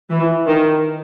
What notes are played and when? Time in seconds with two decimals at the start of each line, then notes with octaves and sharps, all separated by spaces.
0.11 E3
0.47 D#3